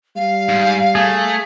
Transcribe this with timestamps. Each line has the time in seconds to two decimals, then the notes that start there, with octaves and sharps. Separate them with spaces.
0.16 G3 F5
0.49 G#2
0.95 A3 G#4